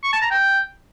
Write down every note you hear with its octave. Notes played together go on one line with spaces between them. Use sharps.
C#6
A5
A#5
G5